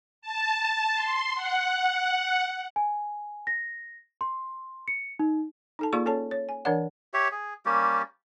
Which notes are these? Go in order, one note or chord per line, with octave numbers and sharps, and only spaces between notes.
A5
C6
F#5
G#5
A#6
C6
C#7
D#4
D#4 A4 A5
A#3 F4 G#4 D5 C#6
C#4 A4 C#5 A5
C#5
G#5
E3 D4 A#4 C#5 D5 F#5
G4 C#5 E5
G#4
G3 A#3 C#4 G4